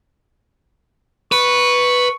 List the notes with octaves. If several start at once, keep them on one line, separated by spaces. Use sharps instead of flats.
B4 C#6